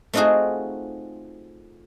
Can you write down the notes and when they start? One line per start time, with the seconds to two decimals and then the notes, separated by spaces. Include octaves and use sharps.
0.13 A3 C4 D#4 F4 F#4 G#4